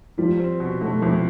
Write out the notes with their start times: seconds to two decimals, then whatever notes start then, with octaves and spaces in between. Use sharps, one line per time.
0.18 F3 G3 F4
0.39 C4
0.60 B2
0.81 B2 A3 A4
1.02 C2 F3 F4